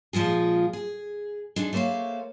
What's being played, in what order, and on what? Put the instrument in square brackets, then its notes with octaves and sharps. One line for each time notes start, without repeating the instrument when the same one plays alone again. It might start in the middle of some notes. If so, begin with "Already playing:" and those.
[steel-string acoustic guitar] A#2 F3 G#3 F4 G#4
G#4
G#3 D4 D#4
A3 A#3 C5 C#5 F5